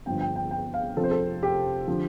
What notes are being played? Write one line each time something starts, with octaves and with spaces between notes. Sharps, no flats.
G1 G2 F3 G5
G5
G5
G5
F5
F1 F2 C3 F3 A4
C5
A4
G4
D3 F3